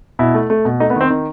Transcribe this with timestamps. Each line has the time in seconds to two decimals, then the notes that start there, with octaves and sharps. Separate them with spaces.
0.19 B2 E4
0.34 A3
0.50 A3
0.65 B2
0.80 A3 D#4
0.90 B3
0.96 D#3 C4
1.10 D#3